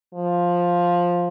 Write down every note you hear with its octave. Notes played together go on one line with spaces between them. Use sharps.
F3